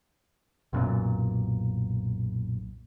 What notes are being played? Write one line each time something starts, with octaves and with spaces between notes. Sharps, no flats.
B1 F#2 A#2